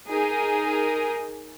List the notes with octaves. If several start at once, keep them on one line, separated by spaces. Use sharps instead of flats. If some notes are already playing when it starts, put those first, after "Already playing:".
D#4 G#4 A#4